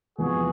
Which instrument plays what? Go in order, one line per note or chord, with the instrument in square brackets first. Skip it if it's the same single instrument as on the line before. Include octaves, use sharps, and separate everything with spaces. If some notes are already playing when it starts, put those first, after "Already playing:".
[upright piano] E2 C3 F3 G#3 B3 [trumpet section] F#4 G#4